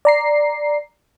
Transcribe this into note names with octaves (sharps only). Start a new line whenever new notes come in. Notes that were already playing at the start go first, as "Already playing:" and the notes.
D5 A#5 C7